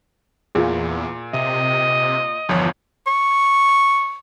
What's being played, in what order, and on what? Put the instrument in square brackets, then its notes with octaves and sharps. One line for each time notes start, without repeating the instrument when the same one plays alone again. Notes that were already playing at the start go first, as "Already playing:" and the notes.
[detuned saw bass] E2 [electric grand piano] A#2 [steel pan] F4 G#4
[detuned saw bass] C3 [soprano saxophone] D#5 [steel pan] E5
[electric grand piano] G1 E2 C#5 [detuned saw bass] F3
[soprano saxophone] C#6